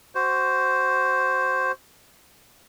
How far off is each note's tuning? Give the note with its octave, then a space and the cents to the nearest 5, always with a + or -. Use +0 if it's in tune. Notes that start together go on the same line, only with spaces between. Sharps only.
F#4 +15 C5 +0